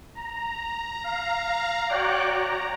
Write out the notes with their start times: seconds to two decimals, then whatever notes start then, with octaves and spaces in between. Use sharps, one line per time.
0.15 A#5
1.04 F5 A#5
1.89 F#4 C#5 D5 G5 D6 F#6
2.29 A#5